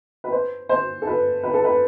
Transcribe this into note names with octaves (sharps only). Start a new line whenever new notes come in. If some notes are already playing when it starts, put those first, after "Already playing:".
B4
C5
C5
A4
B4
B4
A4
B4